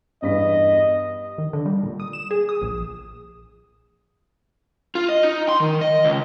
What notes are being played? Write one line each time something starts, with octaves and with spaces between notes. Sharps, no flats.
E2 G2 D#5 B6
D#3
D3
G3
A#2
D#6
E7
G#4
D#6
A#1
F4
D#5
D#4
C6
D#3
D#5
C#2